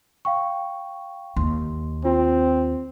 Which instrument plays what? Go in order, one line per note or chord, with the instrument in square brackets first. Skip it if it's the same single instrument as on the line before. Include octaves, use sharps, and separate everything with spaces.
[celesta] F5 G5 C#6
[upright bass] D#2 [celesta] C6
[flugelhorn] C4 [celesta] F4